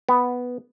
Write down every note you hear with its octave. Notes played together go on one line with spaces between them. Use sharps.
B3